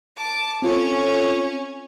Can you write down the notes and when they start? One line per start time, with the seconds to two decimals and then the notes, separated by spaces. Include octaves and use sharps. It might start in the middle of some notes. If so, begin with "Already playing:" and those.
0.17 A5 D6
0.62 C4 C#4 F4 A4 C#5